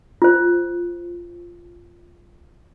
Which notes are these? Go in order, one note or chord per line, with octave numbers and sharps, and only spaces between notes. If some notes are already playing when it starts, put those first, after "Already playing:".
F4 C5